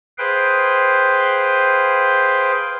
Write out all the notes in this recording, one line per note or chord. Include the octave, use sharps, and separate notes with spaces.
G#4 B4 C5 F5 G5